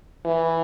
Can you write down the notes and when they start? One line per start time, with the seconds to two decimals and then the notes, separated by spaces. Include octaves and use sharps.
0.25 E3